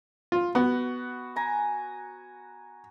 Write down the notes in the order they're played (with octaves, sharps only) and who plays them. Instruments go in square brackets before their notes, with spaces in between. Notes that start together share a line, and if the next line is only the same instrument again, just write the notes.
[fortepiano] F4
[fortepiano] B3 [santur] F#4
[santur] G#5 A#5